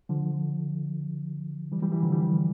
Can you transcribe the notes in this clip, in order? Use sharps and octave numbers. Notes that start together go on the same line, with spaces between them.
D3 F3
E3 G3
E3 G3
E3 G3
D3 F3
E3 G3